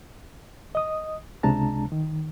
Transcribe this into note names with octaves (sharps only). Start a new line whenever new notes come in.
D#5 D#6
C#2 C3 G#3 D4 A5 A#5
D#3